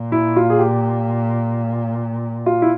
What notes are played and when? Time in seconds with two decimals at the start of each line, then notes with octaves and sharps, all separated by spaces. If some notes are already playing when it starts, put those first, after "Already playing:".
Already playing: A#2
0.12 E4
0.36 F4
0.50 G#4
0.59 G4
2.46 F4
2.62 E4